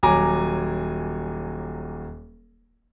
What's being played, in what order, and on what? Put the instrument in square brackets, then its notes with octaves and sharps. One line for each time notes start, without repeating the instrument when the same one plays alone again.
[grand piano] D#1 F#3 C#5 G#5 A#5 D6